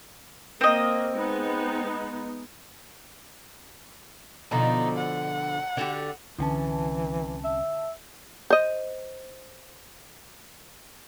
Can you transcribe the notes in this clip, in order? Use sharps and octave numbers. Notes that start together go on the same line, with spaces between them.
A#3 C4 D#5
G#3 B3 D#4
B2 D3 F3 D#4
F#5
D3 F#4 G4
C2 D3 E3 C4 C#4 A5
E5
C5 D#5